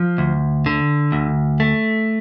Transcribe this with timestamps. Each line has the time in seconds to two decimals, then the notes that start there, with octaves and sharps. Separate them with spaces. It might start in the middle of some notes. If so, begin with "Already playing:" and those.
Already playing: F3
0.18 D2
0.66 D3
1.12 D2
1.60 A3